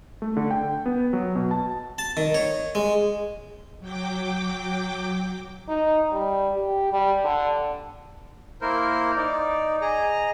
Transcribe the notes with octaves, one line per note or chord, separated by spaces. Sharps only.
A3
D3
G5
B3
F#3
B2
A5
A5
D#3
C#5
G#3
F#3 G5 D6
D#4
G3
G4
G3
D3
A#3 E4 A#4 C5
D#4 D5
G#4 D#5 A#5